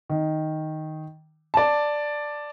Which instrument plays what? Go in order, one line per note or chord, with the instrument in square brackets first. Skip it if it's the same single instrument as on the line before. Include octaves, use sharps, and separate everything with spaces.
[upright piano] D#3
D5 A5